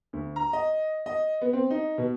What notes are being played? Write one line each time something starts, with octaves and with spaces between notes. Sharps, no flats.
D2
A#5
D#5
D#5
B3
C4
D#4
B2